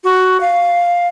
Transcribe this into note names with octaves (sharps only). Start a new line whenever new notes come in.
F#4
F5